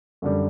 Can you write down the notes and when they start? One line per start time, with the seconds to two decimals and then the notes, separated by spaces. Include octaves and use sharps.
0.22 F#2 D3 G3